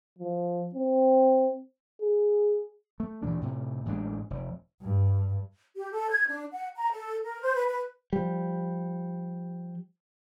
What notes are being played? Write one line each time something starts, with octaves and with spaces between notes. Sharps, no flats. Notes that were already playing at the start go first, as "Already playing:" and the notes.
F3
C4
G#4
A3
D2 A#2 E3 D4
A2 C3
A1 A2 G#3 D4
F1
G2
G4
A4
G#6
D4
F#5
A#5
A4
A#4
C5
B4
B4
F3 G3